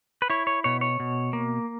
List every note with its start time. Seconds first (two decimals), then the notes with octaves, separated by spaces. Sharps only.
0.22 B4
0.30 E4 C#5
0.47 C#5
0.64 B2 C#5
0.81 C#5
1.00 B2
1.33 A#3